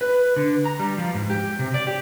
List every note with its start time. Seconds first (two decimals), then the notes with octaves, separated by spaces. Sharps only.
0.01 B4
0.37 D3
0.66 A#5
0.79 G3
0.98 F3
1.14 G#2
1.30 G4
1.59 C3
1.74 D5
1.87 G4